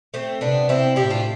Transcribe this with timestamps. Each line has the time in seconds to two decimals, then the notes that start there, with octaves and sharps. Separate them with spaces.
0.14 A3 C4
0.41 C3 B3 D4
0.69 C4 E4
0.96 A2 E4 G4
1.10 D4 F4